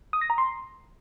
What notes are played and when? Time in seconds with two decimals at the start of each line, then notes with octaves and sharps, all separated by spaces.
0.13 D#6
0.21 A#6
0.30 A#5
0.38 C6